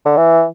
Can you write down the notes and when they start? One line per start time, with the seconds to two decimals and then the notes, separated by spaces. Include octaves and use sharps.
0.05 D3
0.17 E3